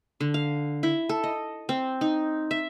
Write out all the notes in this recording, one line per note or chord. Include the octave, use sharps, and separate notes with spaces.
D3
F5
E4
A4
D#5
C4
D#4
E5